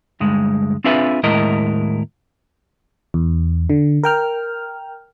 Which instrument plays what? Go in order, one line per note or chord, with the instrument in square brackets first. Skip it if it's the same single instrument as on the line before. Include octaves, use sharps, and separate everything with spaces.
[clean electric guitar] D2 G2 G#3
C4 D4 F4 G#4 B4 E5
D#2 A2 G#3 E4 A#4 D#5
[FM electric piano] E2
D3
A#4 G5 F6